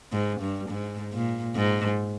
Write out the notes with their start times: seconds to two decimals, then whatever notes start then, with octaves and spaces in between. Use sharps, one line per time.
0.12 G#2
0.41 G2
0.70 G#2
1.13 A#2
1.56 G#2